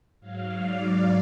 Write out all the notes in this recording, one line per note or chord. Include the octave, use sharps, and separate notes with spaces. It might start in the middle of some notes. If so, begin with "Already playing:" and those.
G#2 F#3 F5
D5